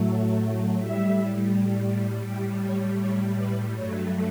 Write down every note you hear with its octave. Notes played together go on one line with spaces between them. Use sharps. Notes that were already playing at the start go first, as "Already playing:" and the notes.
Already playing: A2 F#3 A3
A2 G3 E5
A2 G3 G5
C#5
C#5
B4
G2 F#3 A3 C#5